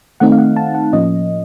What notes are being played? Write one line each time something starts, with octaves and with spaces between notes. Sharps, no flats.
D#3 A3 C4 D#4 F#5
F5
F#5
A5
F#5
A2 F3 A#3 C#4 D#5